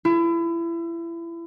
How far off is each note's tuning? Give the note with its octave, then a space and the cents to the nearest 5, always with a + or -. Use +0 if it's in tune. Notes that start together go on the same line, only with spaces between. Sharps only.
E4 +30